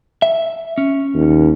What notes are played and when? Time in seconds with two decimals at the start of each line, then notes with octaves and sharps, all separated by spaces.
0.22 E5
0.78 C#4
1.14 D#2